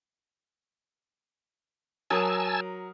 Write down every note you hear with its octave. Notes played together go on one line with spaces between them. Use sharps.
F#3 A#4 G#5 A5 D#6 E6